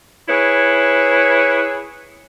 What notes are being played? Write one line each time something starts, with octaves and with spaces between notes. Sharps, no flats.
E4 G#4 B4 C#5